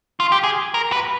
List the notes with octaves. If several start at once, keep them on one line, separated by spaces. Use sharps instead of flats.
F4
G4
G#4
A#4
B4